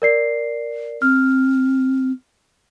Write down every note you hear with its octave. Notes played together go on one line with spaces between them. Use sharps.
A#4 D5 C7
C4 F6